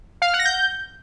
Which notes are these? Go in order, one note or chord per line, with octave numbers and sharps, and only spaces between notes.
F5
F6
F#5
A#6
G6